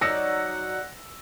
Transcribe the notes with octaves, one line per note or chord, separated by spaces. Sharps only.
F#3 D#4 D5 F#5 E6 A#6 C#7